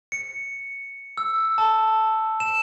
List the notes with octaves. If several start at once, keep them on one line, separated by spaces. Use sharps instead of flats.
C#7
E6
A5
E7